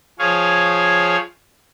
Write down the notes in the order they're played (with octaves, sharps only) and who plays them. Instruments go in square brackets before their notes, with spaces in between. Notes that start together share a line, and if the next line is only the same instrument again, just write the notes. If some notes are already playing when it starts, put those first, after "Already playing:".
[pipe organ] F3 G#4 C#5 F5